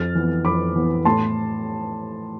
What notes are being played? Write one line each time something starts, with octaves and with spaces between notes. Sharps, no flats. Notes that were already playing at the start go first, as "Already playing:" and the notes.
Already playing: F2 F6 A6
E3 B3
F2 B5 D6
E3 B3
A2 A5 C6